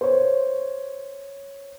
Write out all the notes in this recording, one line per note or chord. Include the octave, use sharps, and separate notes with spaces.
C5 C#5